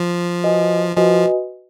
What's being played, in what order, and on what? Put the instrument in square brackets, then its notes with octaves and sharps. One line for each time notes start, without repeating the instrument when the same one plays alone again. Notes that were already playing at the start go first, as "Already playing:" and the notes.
Already playing: [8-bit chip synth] F3
[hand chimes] F#4 B4 D#5 G#5
[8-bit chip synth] F3 [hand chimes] F#4 B4 D#5 G#5